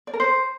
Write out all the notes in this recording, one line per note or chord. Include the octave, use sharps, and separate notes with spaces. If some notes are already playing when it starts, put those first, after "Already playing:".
D5
A#4
C5